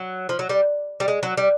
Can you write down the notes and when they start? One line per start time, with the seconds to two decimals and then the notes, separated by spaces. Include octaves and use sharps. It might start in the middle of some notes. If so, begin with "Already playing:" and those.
Already playing: F#3
0.29 F3
0.39 F#3
0.49 G3
1.00 G3
1.08 G#3
1.23 F#3
1.37 G3